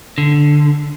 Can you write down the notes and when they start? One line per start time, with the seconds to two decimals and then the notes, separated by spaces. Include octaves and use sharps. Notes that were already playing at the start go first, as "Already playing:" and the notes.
0.18 D3